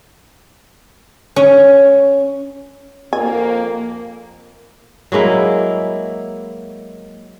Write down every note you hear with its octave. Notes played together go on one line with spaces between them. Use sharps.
C#4
F2 A#3 G#5
F#3 G#3 A#3 E4